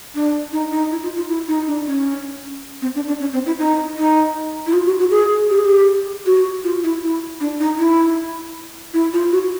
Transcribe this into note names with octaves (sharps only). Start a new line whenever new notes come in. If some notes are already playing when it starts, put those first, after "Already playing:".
D4
D#4
D#4
E4
F4
F4
E4
D#4
D4
C#4
C4
D4
D4
C#4
C4
E4
D#4
D#4
E4
F4
F#4
F#4
G#4
G4
G#4
G4
F#4
F4
E4
E4
D4
D#4
E4
E4
F4
F#4